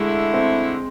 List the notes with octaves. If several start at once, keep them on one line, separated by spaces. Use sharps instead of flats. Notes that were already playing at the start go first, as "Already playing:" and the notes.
Already playing: D3 G#3 A3 E4
C4